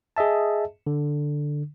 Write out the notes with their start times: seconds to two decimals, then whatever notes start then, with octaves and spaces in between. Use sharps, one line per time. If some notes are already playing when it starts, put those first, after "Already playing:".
0.17 G#4 D#5 E5 A5
0.87 D3